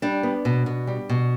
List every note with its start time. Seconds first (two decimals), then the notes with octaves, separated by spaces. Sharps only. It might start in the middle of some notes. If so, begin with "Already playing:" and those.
0.02 G3 D4
0.23 B3
0.45 B2
0.66 B2
0.87 G3
1.09 B2